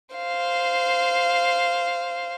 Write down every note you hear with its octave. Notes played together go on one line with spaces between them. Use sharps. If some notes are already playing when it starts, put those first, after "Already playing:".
C5 F5